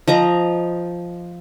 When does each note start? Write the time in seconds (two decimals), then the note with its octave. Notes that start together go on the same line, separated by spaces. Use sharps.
0.08 F3 D#5 A#5